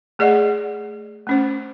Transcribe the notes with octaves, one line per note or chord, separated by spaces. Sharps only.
A3 G#4 D5 D#5 F#5
A3 C#4 C5